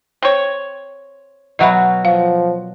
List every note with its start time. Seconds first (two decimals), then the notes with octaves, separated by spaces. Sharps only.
0.22 C4 C#5
1.59 B2 F#3 F#4 D#5 E5 B5
2.05 F3 F5